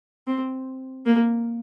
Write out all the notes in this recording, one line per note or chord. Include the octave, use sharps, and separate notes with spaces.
C4
A#3